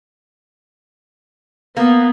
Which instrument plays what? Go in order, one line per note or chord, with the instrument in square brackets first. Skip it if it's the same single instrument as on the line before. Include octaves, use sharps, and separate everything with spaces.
[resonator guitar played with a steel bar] A#3 [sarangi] B3